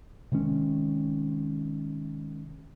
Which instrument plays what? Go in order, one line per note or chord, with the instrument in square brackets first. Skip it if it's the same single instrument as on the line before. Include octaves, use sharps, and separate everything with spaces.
[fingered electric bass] C3 D#3 G#3 C#4